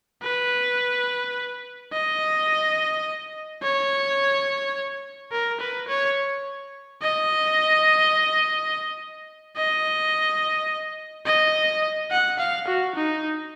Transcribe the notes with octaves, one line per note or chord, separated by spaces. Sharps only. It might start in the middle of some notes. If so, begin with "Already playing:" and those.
B4
D#5
C#5
A#4
B4
C#5
D#5
D#5
D#5
F#5
F5
F#4
D#4